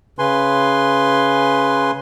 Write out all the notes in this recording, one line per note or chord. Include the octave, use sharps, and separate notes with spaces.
C#3 B4 G#5 C6